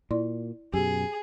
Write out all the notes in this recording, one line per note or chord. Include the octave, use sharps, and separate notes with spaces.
A#2 E4 D5 C6
F#2 B2 G4 G#4